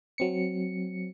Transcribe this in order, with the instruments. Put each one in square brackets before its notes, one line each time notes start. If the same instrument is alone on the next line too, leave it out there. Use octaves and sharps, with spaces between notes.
[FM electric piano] F#3 C4 C#7